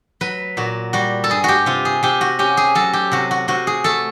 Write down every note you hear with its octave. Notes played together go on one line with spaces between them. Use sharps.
F#3 B4
A#2 F#4
G3 F#4
A4
G2 G#4
F#4 G4
C3 F4
G#4
C3 G4
F#4
C#4 G4
G#4
F#3 A4
G4
C3 F#4
F#4
C3 F#4
G#4
A3 A4